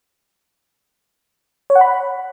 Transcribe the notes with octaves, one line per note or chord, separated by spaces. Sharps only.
C#5
F#5
B5